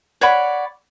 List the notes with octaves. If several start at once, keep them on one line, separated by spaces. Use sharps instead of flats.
C#5 D5 F#5 B5